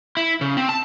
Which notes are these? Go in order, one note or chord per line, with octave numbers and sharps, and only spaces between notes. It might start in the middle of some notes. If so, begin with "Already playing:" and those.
E4
C#3
C4
A5